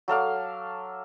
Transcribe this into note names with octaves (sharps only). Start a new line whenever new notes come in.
F#3 A4 F5 D6